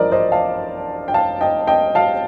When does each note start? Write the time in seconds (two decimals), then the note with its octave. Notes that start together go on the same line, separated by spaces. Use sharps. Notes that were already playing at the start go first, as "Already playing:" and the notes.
Already playing: A1 G2 F3 A#4 C5 D5 D#5
0.11 C5 D#5
0.32 F5 A5
1.08 G5
1.14 F5 A5
1.41 D#5 G5
1.67 D#5 G5
1.95 F5 A5